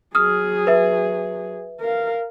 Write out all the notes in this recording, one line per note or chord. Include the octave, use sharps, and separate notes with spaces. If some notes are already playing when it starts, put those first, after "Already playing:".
F#3 G#4 D#6 F6
B4 E5
A#4 F5